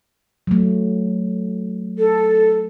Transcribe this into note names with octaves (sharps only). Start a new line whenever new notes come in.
F#3 A3
A4